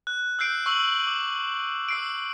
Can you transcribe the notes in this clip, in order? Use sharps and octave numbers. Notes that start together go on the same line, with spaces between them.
F#6
E6 F#6 G6 C7 D7
C#6 E6 F#7
D6
E6 C7 D7